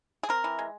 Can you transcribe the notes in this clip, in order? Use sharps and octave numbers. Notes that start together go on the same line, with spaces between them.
G#4
C4 A#4
E3
G#3